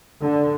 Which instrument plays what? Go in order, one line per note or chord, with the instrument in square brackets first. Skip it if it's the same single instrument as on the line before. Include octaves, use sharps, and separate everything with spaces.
[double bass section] D3